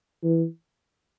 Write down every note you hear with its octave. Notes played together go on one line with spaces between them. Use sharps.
E3